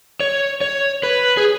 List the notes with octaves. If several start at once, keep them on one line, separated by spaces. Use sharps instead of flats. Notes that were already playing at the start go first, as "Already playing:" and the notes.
C#5
C#5
B4
G#4